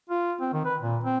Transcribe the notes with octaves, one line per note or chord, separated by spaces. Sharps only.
F4
C4
D#3
B4
A#2
C4